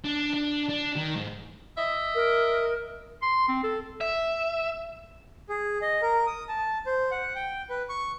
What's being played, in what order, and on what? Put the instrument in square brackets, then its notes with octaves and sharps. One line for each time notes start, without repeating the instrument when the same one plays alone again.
[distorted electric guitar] D4
D4
D4
D#3
G#2
[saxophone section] D#5 E5
[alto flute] A#4
[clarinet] C6
C4
A4
[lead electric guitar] E5
[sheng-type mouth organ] G#4
D#5
A#4
D#6
A5
C5
F#5
G5
B4
C#6